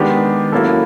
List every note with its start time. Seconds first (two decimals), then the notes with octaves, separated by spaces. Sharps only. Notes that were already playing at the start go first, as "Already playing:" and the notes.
Already playing: D#3 G#3 B3 D4 G4
0.52 F#3 A#3 C#4 E4 A4